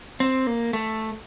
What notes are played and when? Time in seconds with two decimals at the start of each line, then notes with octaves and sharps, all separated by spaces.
0.20 C4
0.47 A#3
0.73 A3